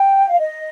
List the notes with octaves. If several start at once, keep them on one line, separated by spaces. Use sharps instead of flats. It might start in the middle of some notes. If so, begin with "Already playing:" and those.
Already playing: G5
F5
D#5